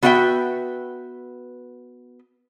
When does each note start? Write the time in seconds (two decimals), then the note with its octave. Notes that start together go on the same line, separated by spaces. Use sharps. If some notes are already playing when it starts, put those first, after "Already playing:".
0.03 B3 F#4 B4 E5 F#5 G5